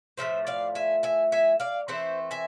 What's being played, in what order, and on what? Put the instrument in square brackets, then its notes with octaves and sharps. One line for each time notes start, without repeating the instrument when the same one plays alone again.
[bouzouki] A2 F3 A3 C5 E5
D5 F5
E5 G#5
E5 G#5
E5 G#5
D5 F5
E3 A3 C4 C5 E5
E5 G#5